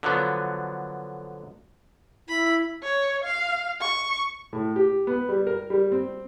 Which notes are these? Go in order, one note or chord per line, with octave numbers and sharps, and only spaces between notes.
D3 F3 F#3 B3
E4 B5
C#5
F5
C#6
A2
G4
B3
G3
A#4
G3
C4